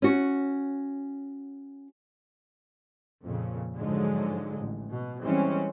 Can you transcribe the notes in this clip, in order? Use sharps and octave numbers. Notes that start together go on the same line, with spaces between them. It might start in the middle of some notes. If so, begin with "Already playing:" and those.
C#4 F#4
F2 A#2 C#3
G#2 D3 F3 F#3 G#3
A1
B2
E3 G3 G#3 C4 C#4